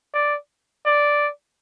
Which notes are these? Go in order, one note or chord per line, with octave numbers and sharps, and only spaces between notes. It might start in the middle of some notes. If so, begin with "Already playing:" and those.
D5
D5